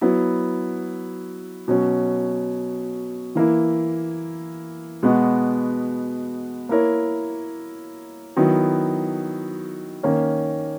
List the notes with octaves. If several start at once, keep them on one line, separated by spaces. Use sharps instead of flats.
F#3 B3 E4
B2 F#3 C#4
E3 A#3 E4
B2 G#3 B3 F#4
A#3 E4 A#4 C#5
D#3 F#3 B3 E4
D#3 A#3 C#4